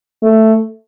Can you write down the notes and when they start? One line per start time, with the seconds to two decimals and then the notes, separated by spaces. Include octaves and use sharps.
0.23 A3